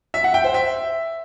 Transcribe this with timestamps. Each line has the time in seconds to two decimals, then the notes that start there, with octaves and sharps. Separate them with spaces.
0.14 E5
0.24 F#5
0.34 G5
0.44 C5
0.54 E5